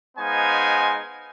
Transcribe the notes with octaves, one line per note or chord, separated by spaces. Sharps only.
G#3 B3 D#4 C5 F5 G#5